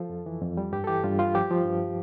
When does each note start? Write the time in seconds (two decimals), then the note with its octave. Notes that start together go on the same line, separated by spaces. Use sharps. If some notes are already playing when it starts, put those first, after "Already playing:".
Already playing: F3 A4
0.09 F2
0.26 E3
0.41 F2
0.57 G3
0.72 G2 G4
0.84 A4
0.87 E3 G4
1.04 G2 F4
1.19 G3 F4
1.35 F3 G4
1.51 F3
1.66 G2